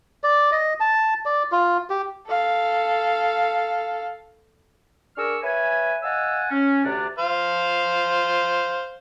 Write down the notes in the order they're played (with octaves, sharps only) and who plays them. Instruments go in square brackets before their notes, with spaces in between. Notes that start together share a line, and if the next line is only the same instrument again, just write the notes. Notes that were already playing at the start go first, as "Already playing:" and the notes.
[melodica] D5
D#5
A5
D5
F4
G4
[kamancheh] A4 F5
[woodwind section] D4 G#4 A#4 C#6 E6 F6
B4 C#5 E5 G#5
D#5 F5 F#5 G#5 A5 E6
C#4
D2 C3 D4
[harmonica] C5 F5